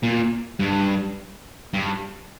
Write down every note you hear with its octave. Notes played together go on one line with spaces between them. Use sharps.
A#2
G2
G2